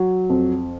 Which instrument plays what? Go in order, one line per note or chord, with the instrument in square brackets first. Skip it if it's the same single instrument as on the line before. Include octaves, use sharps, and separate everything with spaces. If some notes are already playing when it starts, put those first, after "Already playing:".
Already playing: [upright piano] F#3
F2